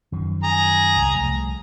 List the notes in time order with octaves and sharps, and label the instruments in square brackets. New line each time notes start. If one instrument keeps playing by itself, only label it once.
[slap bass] F#2 D#3 F3
[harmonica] G#4 A#5
[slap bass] C2
C2 F3 A3